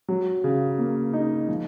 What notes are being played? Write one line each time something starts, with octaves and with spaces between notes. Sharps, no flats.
F#3
C#3
A#3
D#4
F3